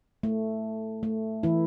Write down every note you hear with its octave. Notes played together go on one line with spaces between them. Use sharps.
A3
A3
E3 E4